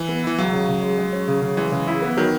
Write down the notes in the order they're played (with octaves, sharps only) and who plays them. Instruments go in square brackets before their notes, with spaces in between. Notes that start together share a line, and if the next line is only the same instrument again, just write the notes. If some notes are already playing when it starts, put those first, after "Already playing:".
Already playing: [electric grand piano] E3
[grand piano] B3
[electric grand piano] E3 [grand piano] E4
[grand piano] C#2 [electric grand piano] F#3
[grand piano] C#3
C#3
G#3
G#3
C#4
C#3
C#3
[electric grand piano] E3 [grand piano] G#3
[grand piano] C#3
E4
B3
[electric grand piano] D#3 [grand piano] F#3